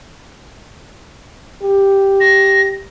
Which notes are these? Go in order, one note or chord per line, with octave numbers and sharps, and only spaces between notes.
G4
A#6